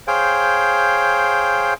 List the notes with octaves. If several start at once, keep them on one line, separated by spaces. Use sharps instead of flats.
G#4 C5 C#5 F5 G5